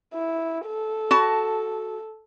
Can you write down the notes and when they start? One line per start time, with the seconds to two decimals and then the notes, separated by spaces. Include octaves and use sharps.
0.13 E4
0.66 A4
1.11 F#4 A5